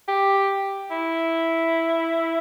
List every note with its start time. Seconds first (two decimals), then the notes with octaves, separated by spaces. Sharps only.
0.09 G4
0.91 E4